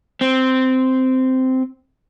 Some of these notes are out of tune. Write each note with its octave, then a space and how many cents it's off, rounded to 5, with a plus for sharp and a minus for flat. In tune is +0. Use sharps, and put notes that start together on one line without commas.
C4 -10